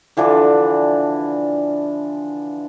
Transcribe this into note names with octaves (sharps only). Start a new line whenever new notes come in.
D3 E3 F3 D4